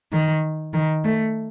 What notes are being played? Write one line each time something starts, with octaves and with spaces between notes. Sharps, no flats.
D#3
D#3
A3